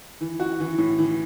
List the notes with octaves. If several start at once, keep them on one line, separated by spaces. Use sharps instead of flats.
E3
F#4
E3
A2
E3